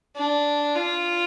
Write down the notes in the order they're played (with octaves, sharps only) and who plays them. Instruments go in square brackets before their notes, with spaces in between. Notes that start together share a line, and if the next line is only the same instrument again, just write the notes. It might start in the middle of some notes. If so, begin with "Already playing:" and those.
[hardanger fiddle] D4
F4